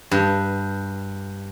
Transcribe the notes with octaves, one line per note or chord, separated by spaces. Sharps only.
G2